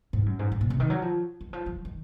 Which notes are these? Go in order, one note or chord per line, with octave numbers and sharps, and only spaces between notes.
G#2
F#2
G#2
G#2
A#2
C3
D#3
F#3
F3
D#3
F3
F3
D#3